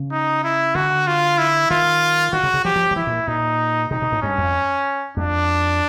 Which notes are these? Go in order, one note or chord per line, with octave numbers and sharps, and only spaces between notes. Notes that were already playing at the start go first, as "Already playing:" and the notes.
Already playing: C#3
D#4
E4
D3 F#4
F4
E4
D#3 F4
D#3 F#4
C#3
C#3
F3 G4
F3
F3
E3 E4
A#2
A#2 D#4
C3 D#4
B2
A2
G2 C#4
F2
F2 D4